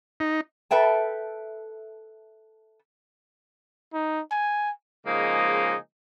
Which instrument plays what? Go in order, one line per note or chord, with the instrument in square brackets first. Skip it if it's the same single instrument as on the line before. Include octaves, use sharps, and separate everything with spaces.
[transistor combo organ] D#4
[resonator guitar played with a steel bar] A4 B4 E5 G5 A5
[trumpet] D#4
G#5
[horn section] C#3 F3 G#3 A#3 D#4 G#4